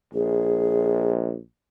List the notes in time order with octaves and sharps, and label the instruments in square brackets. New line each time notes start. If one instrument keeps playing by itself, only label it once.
[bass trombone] A#1 [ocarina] G#4